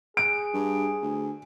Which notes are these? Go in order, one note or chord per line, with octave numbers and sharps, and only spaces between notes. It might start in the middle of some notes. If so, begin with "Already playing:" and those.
G#4 D7
G2
D2